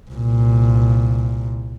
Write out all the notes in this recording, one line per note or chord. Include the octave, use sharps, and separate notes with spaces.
C2 A#2